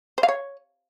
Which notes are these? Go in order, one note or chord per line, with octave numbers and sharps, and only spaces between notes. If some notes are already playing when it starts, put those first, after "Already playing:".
C5
F5
C#5